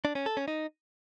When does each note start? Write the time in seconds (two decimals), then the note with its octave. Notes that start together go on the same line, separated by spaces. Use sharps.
0.05 D4
0.15 C#4
0.26 A4
0.37 C#4
0.48 D#4